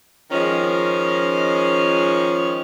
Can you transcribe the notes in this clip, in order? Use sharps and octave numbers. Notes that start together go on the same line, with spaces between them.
D#3 F3 G#3 C#4